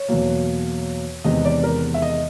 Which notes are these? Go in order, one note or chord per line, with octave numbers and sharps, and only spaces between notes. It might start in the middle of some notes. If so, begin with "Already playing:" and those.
Already playing: C#5
E2 B2 F#3 A#3
E2 C3 D#3 G#3 B3 D#5
D5
A#4
E5
D#5